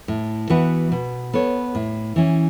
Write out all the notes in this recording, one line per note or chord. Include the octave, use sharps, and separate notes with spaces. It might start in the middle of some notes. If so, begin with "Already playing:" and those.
A2
E3 B3 F#4 B4
B2
B3 A4 C#5
A2
E3 C#4